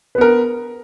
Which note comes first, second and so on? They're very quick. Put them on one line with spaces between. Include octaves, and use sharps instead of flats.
B4 B3 A#4